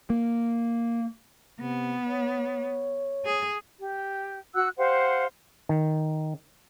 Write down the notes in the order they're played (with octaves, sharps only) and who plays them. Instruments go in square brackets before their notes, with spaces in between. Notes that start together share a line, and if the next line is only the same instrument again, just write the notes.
[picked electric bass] A#3
[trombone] C3 [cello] B3
[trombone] C#5
[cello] G#4
[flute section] G4
F#4 F#5 E6 F#6
G4 C5 F5 F#5
[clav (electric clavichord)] D#3